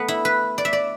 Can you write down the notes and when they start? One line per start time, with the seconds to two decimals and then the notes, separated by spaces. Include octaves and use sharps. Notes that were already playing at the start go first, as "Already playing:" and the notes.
Already playing: A3 B3
0.08 E4
0.25 B4
0.58 D5
0.65 E5
0.73 D5